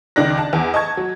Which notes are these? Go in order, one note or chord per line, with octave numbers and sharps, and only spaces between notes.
C#2 D#3 D5 F#6 A#6
A5
E2
D#5 A5 C#6 G#6
F#3